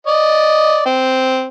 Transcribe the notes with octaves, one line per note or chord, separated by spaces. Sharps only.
D5 D#5
C4